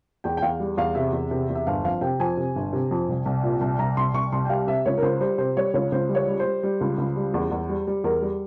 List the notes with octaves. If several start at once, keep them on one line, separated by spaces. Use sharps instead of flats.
E2 G5
G5
E2 F5
G3
E2 F5
C3 E5
E2
C3
E2
E5
G1 F5
F2 F5
C3 G5
F2 G#5
C3
G1
C3
F2
C2
C2
A#2
C2
C2 A#5
C2 C6
C2 C#6
C2 C6
G5
G3 F5
C3 E5
C#2 C#5
A#4
C#2 C5
G3 C5
C3 C5
G3 C#5
C#2 C#5
C#2 C5
G3
C#5
G3
G3 C5
G3
C#2
C#2
G3
E2
E2
G3
G3
E2 A#4
G3